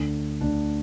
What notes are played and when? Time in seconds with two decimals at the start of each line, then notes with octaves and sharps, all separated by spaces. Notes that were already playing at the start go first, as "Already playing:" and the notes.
Already playing: D2 D3 D4
0.41 D2 D3 D4